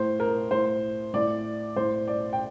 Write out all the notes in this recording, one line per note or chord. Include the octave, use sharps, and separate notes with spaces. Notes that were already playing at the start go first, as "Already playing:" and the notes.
Already playing: A2 C5
A#4
A2 C5
A2 D5
A2 C5
D5
G5